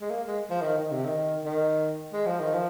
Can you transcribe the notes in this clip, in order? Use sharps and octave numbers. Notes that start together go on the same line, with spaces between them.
G#3
A#3
G#3
F3
D#3
D#3
C3
D#3
D#3
G#3
F3
D#3
F3